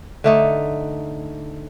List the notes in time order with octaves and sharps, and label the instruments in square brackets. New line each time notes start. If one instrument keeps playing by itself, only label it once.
[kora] D3 A3 D#4